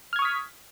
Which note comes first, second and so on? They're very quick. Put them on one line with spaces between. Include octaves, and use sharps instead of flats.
F6 G#6 C#6 D#6 B6